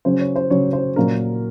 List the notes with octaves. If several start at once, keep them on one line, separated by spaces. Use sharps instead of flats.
C#3 F#3 C#4 C5
C#5
C5
C#3 F#3 C#4 C#5
C5
A#2 F#3 A#3 C#4 A#4